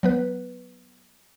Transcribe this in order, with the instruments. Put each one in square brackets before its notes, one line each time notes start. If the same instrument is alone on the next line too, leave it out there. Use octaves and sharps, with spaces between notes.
[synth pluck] F#3 B3 B4